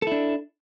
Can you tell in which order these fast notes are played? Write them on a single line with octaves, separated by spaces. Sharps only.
A4 E4 D4